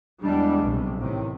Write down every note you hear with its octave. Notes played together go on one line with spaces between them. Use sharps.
E2 E3 G3 G#3 D4
B1 C3
A1 A2 C3 D#3